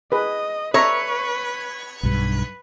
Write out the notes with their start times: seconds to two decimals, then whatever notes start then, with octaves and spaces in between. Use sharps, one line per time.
0.12 G#4 B4 D#5
0.74 A4 B4 C#5 E5 A#5
2.03 B1 G2 B4